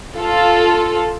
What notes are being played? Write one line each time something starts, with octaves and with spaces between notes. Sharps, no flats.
F4 A4